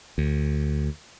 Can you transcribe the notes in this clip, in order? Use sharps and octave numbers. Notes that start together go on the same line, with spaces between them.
D2